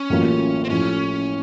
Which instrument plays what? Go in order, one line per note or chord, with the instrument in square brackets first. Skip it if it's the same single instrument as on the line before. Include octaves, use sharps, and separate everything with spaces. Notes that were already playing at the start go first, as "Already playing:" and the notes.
Already playing: [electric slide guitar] C#4
[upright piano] A1 A2 F#3 A#3 F4
[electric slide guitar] C4
[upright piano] A2 F3 [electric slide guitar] C#4